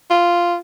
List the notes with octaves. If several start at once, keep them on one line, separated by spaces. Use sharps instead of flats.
F4